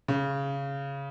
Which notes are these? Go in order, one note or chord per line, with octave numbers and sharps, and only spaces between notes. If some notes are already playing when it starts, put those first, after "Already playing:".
C#3